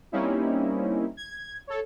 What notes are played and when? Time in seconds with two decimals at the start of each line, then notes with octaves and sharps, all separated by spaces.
0.12 G3 A#3 C4 C#4 D#4 E4
1.17 G#6
1.67 A4 C#5